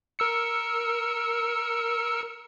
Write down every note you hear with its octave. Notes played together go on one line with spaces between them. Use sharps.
A#4 E6 C#7